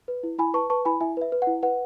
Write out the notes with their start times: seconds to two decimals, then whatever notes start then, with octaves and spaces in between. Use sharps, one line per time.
0.08 B4
0.23 E4
0.38 E4 G#5 B5
0.54 B4 A5 C#6
0.70 B4 A5 C#6
0.85 E4 G#5 B5
1.01 E4 E5 G#5
1.17 B4 E5
1.32 B4
1.42 F#5
1.47 E4
1.63 B4 F#5